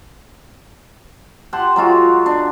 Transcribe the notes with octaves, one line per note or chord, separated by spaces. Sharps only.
G4 F#5 A5 C6
F#3 G#3 F4 F#4
D4